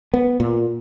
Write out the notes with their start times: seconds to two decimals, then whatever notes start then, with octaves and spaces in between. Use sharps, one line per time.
0.14 B3
0.40 A#2